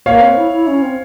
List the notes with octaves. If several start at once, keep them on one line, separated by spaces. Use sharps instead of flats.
A#3 C#5 F5
C4
E4
E4
C#4
C4